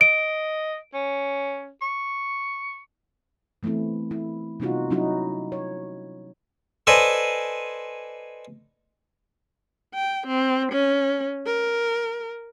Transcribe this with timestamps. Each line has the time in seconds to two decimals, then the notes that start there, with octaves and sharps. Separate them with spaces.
0.01 D#5 D7
0.94 C#4
1.82 C#6
3.63 E3 A3 B3 C4 E4
4.11 E4
4.60 C3 G3 B3 D#4 F4 F#4
4.91 F#3 C#4 D#4 E4 F#4
5.52 C#5
6.87 A4 B4 C5 D5 D#5 G#5
9.94 G5
10.27 C4
10.72 C#4
11.46 A#4